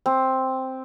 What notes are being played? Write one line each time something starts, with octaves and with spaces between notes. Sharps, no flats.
C4